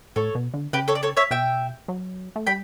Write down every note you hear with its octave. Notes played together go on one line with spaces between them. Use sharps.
A2 A4 C#5
B2
D3
C#3 G4 B4
A4 C#5
D5
A4 C#5
C#5 E5
B2 E5 G5
F#3
A3
G3 G5 B5